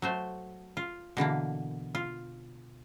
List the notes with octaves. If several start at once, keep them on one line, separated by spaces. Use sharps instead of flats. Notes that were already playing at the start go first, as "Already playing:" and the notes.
F#3 A3 C5
F4
B2 D3 E3 A#3
F4